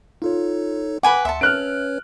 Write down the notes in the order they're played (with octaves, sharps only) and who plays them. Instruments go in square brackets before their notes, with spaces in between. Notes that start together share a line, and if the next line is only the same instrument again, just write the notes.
[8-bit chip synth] D#4 A4 C#5 [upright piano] F4
[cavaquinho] B4 G#5 D6 [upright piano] F#5
[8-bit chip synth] D2 C6 C#7 [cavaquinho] E5 A5
[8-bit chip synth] C#4 B4 C#5 [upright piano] F6 F#6 D7